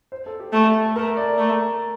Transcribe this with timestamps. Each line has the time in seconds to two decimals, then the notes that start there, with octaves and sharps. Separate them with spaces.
0.12 C5
0.26 A4
0.40 G4
0.53 A3 A4
0.86 A4
0.96 A3 A#4
1.17 D5
1.38 A3